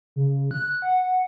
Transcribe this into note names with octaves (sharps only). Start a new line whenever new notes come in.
C#3
F#6
F#5